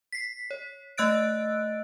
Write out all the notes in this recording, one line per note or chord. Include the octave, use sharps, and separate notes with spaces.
B6 C7
C#5
A3 D#5 E6 F#6 A6 D7